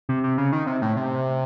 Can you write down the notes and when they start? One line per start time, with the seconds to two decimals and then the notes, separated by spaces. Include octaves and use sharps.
0.09 C3
0.24 C3
0.38 C#3
0.52 D#3
0.67 C3
0.82 A2
0.97 C3